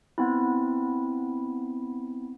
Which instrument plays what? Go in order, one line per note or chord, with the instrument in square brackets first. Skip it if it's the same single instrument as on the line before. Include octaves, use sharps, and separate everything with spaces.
[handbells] B3 C4 E4